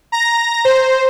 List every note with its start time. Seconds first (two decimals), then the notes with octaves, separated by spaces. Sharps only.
0.12 A#5 A#6
0.65 C5